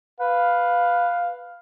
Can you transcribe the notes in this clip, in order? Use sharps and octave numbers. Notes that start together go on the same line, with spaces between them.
B4 F5